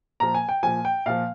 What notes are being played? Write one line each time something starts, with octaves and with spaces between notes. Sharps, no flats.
A#2 F3 A#5
G#5
G5
A#2 F3 G#5
G5
A#2 F3 F5